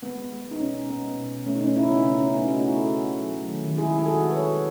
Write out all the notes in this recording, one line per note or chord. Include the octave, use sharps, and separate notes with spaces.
G#3 B3
G#3
G#3
G#3
D#4
B2 C#4
G#3
G#3 B3
G#3 B3
B2
B2
A3 C#4
D#4
B2 C#4
C#3 C#4 E4
C#3 B3 D#4
C#3 C#4
C#3 C#4
A3 B3 D#4
A3 D#4 F#4
A3 E4 G#4
A3 F#4 A4
C#3
C#3
F#3
A3
D#3
D#3
G#3 E4 G#4
G#3
G#4
D#3 F#4 A4
G#3
B4
G#3 A4 C#5
G#3